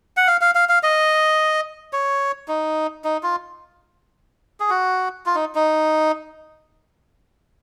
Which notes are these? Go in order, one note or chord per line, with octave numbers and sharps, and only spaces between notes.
F#5
F5
F5
F5
F5
D#5
C#5
D#4
D#4
F4
G#4
F#4
F4
D#4
D#4